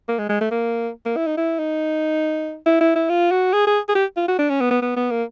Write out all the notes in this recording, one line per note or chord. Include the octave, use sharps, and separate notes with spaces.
A#3
G#3
G#3
A3
A#3
A#3
E4
D#4
E4
D#4
E4
E4
E4
F4
F#4
G#4
G#4
G#4
G4
F4
F#4
D4
C#4
B3
B3
B3
B3
A#3